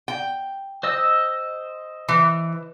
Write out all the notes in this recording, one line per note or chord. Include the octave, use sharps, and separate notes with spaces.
G5
C5 D#5 E6
E3